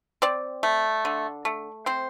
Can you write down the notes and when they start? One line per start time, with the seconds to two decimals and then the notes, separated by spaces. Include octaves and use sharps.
0.22 C4 D5
0.63 A3
1.05 D3
1.45 A3
1.86 C4 C5